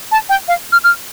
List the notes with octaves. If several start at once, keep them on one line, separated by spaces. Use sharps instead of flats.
A5
G5
F5
F6
F6